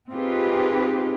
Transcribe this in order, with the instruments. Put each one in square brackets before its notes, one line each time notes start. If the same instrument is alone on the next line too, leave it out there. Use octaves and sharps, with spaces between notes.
[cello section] C4 D#4 F4 G4 G#4 B4